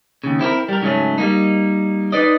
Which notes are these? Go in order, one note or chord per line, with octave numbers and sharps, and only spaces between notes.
D#2 C#3
C4 E4 G4 A#4
G3 A#4
G#2 C#3 F#3 G3 A3 C#4
G3 A#3 D#4
D#4 B4 D5 D#5